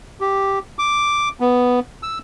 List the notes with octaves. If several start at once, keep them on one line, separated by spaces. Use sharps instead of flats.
G4
D6
B3
E6